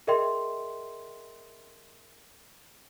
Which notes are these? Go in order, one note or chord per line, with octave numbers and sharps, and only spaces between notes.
G#4 A#4 D#5 E5 G5 C6